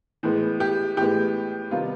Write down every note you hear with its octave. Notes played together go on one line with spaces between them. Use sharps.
A2 E3 G#3 B3
G4
A2 E3 G#3 B3 G4
C3 D#3 G3 B3 F4